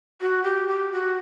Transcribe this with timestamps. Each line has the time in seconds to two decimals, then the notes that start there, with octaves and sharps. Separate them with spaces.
0.21 F#4
0.44 G4
0.68 G4
0.92 F#4